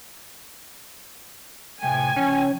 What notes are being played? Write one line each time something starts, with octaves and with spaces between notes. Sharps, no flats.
A2 C3 A3 G5 G#5
C#3 F3 C#4